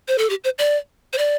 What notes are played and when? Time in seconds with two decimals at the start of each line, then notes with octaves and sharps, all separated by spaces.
0.08 C5
0.18 A4
0.30 G4
0.44 C5
0.59 D5
1.13 C5
1.18 D5